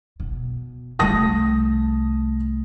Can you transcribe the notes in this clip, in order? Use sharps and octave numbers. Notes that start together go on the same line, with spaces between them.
B2
C2 A3 A5 D#6 A#6